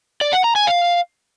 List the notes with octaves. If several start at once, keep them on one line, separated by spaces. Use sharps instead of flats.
D5
F#5
A#5
G#5
F5